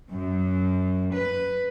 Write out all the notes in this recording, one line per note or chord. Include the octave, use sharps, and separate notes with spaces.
F#2
B4